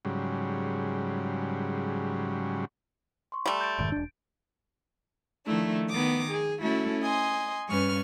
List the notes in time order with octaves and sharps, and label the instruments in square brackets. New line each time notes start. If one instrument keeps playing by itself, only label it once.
[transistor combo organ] G#2 C#3 F#3 G3
[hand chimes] C6 C#6
[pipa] G3 A3 [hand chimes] C6
[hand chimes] G6 A6 D7
[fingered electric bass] F1 G#2 D#3 [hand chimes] D7
[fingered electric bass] E1 D4
[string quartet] D#3 F3 A3 D4 E4
D#3 B3 D6 D#6
G#4
A3 C#4 E4 F#4 A4
D#5 G#5 C6
G2 C#4 B4 C#6 F6